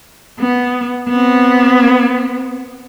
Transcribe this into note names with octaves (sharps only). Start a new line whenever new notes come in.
B3
B3 C4